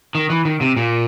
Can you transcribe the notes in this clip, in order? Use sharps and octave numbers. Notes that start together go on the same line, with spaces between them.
D#3
E3
D#3
C3
A#2